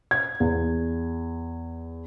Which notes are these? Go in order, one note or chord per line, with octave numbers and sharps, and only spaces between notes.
G#6
E2